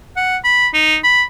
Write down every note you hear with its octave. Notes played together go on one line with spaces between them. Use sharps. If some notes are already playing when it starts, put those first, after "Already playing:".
F#5
B5
D#4
B5